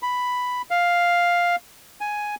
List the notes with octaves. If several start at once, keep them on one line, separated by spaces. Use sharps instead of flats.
B5
F5
G#5